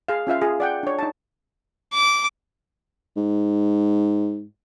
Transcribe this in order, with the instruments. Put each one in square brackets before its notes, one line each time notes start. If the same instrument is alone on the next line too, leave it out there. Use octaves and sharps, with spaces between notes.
[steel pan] G#4 F5
C#4 F4 E5 F5
F4 G#4
D5 F#5 G5
D4 C#5
D#4 A5
[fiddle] D6
[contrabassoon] G#2